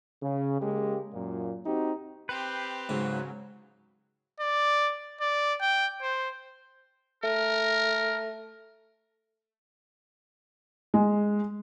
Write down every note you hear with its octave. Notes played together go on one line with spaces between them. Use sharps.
C#3
C#3 G#3 A#3 G4
F#2 A#2
C4 D#4 F#4 G4
C4 G4 B4 C5
G#2 C#3 F#3
D5
D5
G5
C5
A3 A#4
G#3